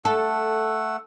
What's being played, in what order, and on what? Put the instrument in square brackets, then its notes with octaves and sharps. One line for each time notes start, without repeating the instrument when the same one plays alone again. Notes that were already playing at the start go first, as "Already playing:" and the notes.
[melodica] A3 F#5 E6 [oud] A4